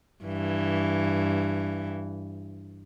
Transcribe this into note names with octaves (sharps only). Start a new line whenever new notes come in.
G2 E3